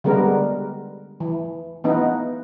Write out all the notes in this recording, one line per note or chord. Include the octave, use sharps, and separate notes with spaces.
D3 G3 G#3 B3 A#4
E3
E3 B3 D#4